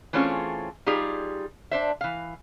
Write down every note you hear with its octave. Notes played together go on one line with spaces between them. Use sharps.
E3 A3 C4 C#4 F4 G#4
G3 D#4 F4 G4 G#4
D4 C5 E5
E3 F5